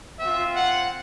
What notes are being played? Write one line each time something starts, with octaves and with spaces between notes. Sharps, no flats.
C4 F4 E5
F#5